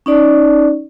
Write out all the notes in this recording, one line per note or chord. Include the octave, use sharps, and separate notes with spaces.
C#4 D#4 D5